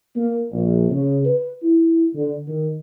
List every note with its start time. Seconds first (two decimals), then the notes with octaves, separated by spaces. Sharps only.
0.16 A#3
0.52 A#1
0.90 C#3
1.25 B4
1.63 E4
2.15 D3
2.48 D#3